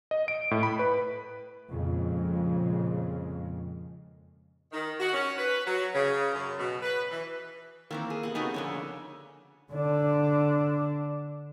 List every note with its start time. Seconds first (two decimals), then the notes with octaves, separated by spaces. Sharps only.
0.11 D#5
0.28 D7
0.51 A2
0.63 B5
0.79 B4
1.69 F2 A#2 C#3 G#3
4.72 D#3
4.99 F#4
5.13 C#4
5.38 B4
5.66 F#3
5.94 C#3
6.34 F#2
6.59 B2
6.82 B4
7.10 E3
7.91 D#3 E3 A#3 C4
8.10 G#4
8.23 C3 B3 F#5
8.35 C#3 A3 B3 D#4 F#4 A#4
8.54 F2 A#2 D3 C#5
9.72 D3 D4